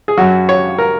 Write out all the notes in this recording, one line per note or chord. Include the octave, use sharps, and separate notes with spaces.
G#4
F#2 F#3 F#4
C#5
A#4